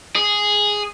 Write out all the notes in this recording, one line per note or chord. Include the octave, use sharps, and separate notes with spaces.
G#4